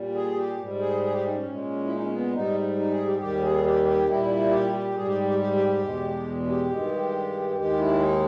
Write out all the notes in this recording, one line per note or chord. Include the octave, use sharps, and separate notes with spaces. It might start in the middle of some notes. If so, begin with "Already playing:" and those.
Already playing: A#2 G3
G#4
G4
G#2 G3
G#4
G#4
G4
D#4
C#4
A#2 G#3
E4
D#4
C#4
B3
G#2 G3 D#4
D#4
G#4
G4
D#2 D#3 G3 G4
G#4
G4
G4
A#2 G3 E4
G4
G4
G#2 G3 G#4
G4
G4
G4
G4
G4
E2 B2 G#3
G4
G2 D#3 G#3
D#2 D#3 G#3 G4
E4
D#4